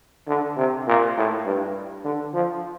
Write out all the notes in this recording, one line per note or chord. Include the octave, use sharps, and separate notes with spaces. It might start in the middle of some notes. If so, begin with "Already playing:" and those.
D3
C3
A#2
A2
G2
D3
F3